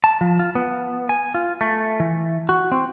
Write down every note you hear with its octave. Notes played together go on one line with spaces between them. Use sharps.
A5
F3
F4
B3
G#5
F4
A3
E3
F#4
C4